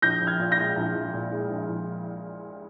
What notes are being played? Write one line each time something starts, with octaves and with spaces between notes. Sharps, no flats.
A#1 G6 A#6
A#1
F6 G#6
A#2
G6 A#6
G#3
A#1
A#1
A#2
G#3
A#1
A#1